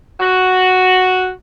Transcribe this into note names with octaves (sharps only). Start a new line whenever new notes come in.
F#4